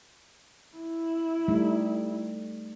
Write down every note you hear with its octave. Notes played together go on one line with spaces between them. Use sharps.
E4
G3 A3 D#4